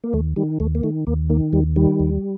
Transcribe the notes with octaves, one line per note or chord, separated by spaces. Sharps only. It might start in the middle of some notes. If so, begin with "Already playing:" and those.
A#3
D#2 A3
D#3 G3
D#2 A3
A#3
D#3 A3
D#2 A#3
D#3 A#3
D#2 G3
D#3 G3
D#2